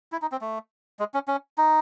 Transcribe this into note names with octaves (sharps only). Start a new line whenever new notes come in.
E4
D#4
C4
A3
G#3
C#4
C#4
D#4